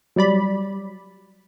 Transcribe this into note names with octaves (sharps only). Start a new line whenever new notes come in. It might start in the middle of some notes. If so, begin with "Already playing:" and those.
F#3 G3 D5 B5